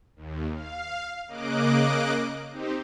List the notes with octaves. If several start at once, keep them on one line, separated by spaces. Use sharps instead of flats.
D#2
F5
C#3 A#3 D#5 D6 F#6 D7
C4 D#4 G4